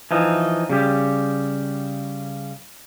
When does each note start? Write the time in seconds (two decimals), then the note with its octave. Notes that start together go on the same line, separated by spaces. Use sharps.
0.11 E3 F3 D#4
0.70 C#3 G3 G4